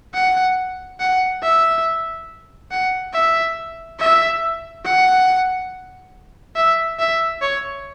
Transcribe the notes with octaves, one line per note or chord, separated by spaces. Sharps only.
F#5
F#5
E5
F#5
E5
E5
F#5
E5
E5
C#5